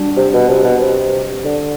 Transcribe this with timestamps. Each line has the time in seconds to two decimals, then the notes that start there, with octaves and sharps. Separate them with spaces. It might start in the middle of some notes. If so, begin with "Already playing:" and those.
Already playing: G3 D4 F#4
0.17 C3
0.33 B2
0.49 C3
0.64 B2
0.81 C3
1.45 D3